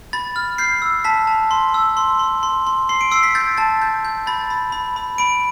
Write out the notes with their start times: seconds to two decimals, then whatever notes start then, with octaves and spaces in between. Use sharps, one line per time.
0.13 B5 A6
0.36 F6
0.58 G6 C7
0.82 E6
1.04 A5 B6
1.27 A5
1.51 C6
1.74 E6
1.97 C6
2.19 C6
2.43 C6
2.67 C6
2.89 C6 C7
3.01 D7
3.12 E6 C7
3.23 B6
3.35 G6 A6
3.57 A5 A6
3.82 G6
4.05 G6
4.27 B5 A6
4.50 B5
4.72 B5
4.96 B5
5.18 B5 D7